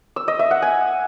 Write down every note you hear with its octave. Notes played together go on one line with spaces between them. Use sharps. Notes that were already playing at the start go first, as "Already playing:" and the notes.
E6
D#5
E5
F#5
G#5